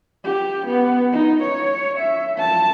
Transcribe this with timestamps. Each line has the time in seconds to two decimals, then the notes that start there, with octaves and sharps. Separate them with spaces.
0.25 G4
0.67 B3
1.12 D#4
1.43 C#5
1.98 E5
2.38 A5